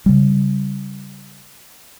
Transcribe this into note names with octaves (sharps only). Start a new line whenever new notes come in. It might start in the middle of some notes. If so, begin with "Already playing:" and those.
C#3 G3